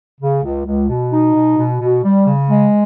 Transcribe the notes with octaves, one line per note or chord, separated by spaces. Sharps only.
C#3
C#2
C#2
B2
D#4
B2
B2
B2
G3
C#3
G#3